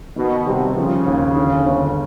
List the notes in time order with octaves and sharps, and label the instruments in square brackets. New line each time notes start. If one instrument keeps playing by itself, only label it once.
[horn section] B2 [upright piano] D#3
[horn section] C3 [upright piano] G3
[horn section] C#3 [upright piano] F3
[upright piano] D#2
D3
G1